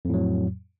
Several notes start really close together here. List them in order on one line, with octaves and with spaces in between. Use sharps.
F2 A2 F#3